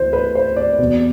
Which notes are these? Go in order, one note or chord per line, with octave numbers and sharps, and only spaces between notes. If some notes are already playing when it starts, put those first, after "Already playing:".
Already playing: D2 E3 C5
B4
C5
D5
E2 B2